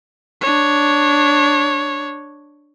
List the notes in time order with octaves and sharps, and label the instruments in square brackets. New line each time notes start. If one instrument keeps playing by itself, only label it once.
[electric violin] D4 C#5